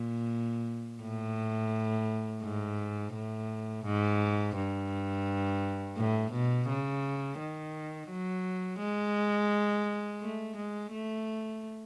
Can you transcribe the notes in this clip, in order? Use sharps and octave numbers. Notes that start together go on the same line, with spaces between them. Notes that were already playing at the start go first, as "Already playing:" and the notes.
Already playing: A#2
A2
G#2
A2
G#2
G2
A2
B2
C#3
D#3
F#3
G#3
A3
G#3
A3